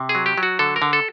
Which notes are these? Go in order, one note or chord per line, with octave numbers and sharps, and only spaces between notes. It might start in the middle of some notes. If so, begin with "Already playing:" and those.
Already playing: C3
G#4
F#3
G4
F#3
F#4
D3 A4
A#4
D3
A4